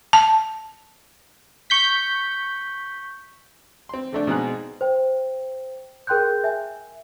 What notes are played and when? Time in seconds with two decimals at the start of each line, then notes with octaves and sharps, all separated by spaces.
0.13 A5
1.70 C#6 G6 B6
3.89 C4 C6
4.13 D3 A3 D4
4.27 B2 G#3 C4 D#4 G#4 F#6
4.81 C5 G5
6.07 G#4 A#4 G5 C6 F#6 G6
6.44 E5 G#5